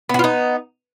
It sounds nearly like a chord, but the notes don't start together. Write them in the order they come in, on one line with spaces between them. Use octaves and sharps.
B3 F#4 F4 D#4